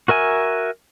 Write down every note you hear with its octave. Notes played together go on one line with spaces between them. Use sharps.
F#4 A#4 E5 G#5